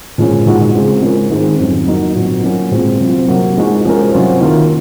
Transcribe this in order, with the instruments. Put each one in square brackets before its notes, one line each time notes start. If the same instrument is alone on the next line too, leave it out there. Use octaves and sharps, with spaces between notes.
[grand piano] A#2 F3 G#3 C#4
A#2 G#3 D#4 F#4
C#3 G#3 C4 F4
F3 G#3 C#4 F4 A#4
G#2 D#3 G#3 C4
F2 D#3 F#3 C#4 F4
F#3 A#3 D#4 F#4
A#2 F#3 C4 F#4
F#3 A#3 C#4 F4
A#2 G#3 C4 F#4
C3 F#3 C4 F4
C3 F#3 A#3
F3 G#3 D#4 F#4
F3 G#3 C#4 F#4 A#4
C3 F#3 C#4 F4 C5
D#3 A#3 F4 A#4